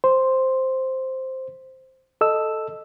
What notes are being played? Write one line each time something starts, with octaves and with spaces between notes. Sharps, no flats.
C5
A4 D#5 E6